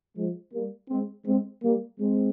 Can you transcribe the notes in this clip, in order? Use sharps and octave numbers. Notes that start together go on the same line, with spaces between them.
F3 G#3
G3 A#3
G#3 C4
G#3 C4
G3 A#3
G#3 C4